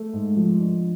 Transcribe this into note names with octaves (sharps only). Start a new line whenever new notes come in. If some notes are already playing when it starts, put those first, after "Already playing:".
Already playing: A3
G#2
F3
D4